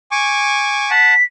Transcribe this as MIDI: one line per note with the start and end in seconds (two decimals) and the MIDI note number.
0.11 0.91 80
0.11 0.91 85
0.11 0.91 86
0.91 1.14 78
0.91 1.14 81
0.91 1.24 95